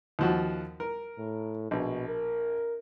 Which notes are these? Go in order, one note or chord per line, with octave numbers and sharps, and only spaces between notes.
D#2 F3 F#4
A#4
A2
A#1 B2
A#4